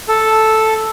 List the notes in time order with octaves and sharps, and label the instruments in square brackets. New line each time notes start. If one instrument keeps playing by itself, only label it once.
[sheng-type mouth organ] A4